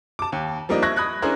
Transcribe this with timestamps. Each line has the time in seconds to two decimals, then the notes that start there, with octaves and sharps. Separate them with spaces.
0.19 A5 D6
0.32 D#2
0.69 F3 G3 A#3 D4 D#4
0.82 E5 C#6 F#6 G#6 A#6
0.96 B5 D#6 F#6 G#6
1.22 C#4 D4 E4 G#4 A#4 C5